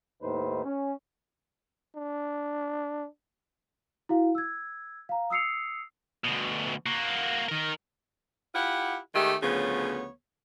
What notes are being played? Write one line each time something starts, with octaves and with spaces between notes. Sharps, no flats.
D#2 A2 D#4 B4 C5
C#4
D4
E4 F#4 F5
E6 G#6
F5 A#5
D#6 E6 C7 C#7 F7
D2 B2
A#3 F#4
D#3 A#4
E4 F4 G4 F#5
D#3 G#3 A3 G4
D2 C#3 F3 B3 C#5